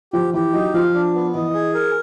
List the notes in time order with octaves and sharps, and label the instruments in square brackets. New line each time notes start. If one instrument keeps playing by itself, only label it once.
[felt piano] F3 F4 [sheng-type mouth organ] G4
[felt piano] E3 E4 [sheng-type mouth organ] G4
[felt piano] F#3 F#4 [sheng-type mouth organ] D#4
[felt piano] F3 F4 [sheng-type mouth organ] F5
[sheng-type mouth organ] D4
B3
[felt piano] E3 E4 [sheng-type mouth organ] D#5
[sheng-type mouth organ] G#4
A#4